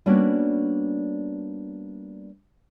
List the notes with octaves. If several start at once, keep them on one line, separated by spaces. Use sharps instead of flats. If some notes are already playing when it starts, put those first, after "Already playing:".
G3 A#3 B3 C#4 D4 F#4